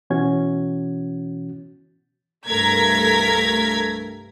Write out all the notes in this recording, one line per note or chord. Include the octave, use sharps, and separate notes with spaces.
B2 E3 C#4 F#4 G#6
C2 G2 A3 A#4 G#6 B6